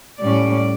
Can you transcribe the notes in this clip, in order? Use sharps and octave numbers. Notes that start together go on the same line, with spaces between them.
A2 G3 C#4 D5